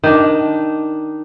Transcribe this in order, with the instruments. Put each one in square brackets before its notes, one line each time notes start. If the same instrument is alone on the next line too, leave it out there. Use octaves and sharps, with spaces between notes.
[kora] D#3 D4